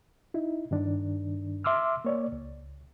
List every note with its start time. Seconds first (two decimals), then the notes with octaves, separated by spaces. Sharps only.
0.34 D#4 E4
0.71 G2 D#3 D4
1.64 E5 C6 D6 E6 F6
2.05 A#3 C#5 D5
2.32 C#2